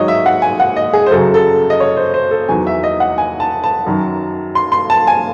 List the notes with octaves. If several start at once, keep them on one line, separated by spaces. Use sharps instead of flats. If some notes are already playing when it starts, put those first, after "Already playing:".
Already playing: G#2 D#3 F#3 C#5 D#5
E5
F#5
G#5
F#5
D#5
G#4
C5
F#2 C#3 F#3 A4
A4
D#5
C#5
C5
C5
A4
E2 D#3 F#3 G#5
E5
D#5
F#5
G#5
A5
A5
F#2 D#3 F#3
C6
C6
A5
G#5